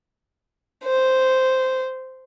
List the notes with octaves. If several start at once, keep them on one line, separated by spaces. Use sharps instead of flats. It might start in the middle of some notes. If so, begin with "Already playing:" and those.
C5